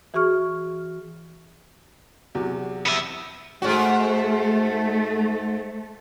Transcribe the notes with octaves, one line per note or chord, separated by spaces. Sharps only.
E3 F#4 G#4 C#6 F6
E2 C3 F#3
B3 E5
G#2 A3 F#4